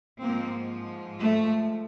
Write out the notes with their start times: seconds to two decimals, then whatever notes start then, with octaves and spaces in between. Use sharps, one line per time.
0.22 G#2 F3 G#3 A#3 C4
1.17 A3